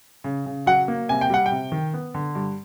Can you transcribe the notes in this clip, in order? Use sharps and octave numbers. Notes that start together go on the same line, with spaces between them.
C#3
C#3
F#3 F#5
A#3
C3 G#5
G5
G3 F#5
G5
C3
D#3
B3
D3
G2